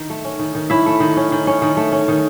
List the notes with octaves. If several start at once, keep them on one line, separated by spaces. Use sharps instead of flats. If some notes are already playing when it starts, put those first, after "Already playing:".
Already playing: D#3
A3
C#4
D#3
D#3
C#4 E4 E5
A3
D#3
C#4
D#3
C#4
D#3
A3
C#4
D#3